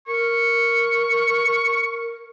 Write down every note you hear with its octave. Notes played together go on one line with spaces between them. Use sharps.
A#4 C#6